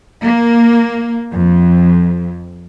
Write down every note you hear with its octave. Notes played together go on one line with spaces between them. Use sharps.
A#3
F2